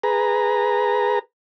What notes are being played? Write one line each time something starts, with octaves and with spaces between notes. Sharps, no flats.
G#4 B4 A#5